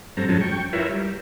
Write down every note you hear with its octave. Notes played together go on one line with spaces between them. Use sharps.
G2 F#3 C4 A4 A#5
F#2 F3 F#3 G#3 C#4 A5
G5 C#6
E4 F4 A#4 B4 C#5 E5
G3